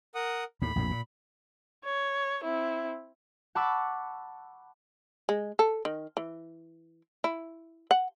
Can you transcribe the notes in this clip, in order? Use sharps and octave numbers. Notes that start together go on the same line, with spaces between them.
A#4 F#5 D#6
D#2 A2 B5
A#1 F2 A2
A#2
C#5
C4 E4
F#5 A5 B5 C#6 D6 E6
G#3
A4
D#3
E3
E4
F#5